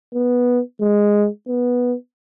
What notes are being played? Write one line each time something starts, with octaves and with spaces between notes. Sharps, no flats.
B3
G#3
B3